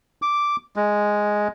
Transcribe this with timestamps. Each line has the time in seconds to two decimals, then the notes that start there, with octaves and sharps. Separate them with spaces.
0.22 D6
0.76 G#3